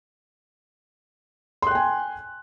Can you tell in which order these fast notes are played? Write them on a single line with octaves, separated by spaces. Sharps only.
C6 F#6 G5 G#5